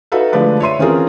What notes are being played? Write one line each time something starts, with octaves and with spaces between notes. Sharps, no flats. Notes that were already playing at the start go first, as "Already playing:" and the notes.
D#4 F#4 A4 B4 E5 F5
D3 F3 G#3 A3 B4 D5
C#5 E5 C6 D#7
E3 C4 C#4 F4 G#4 A#4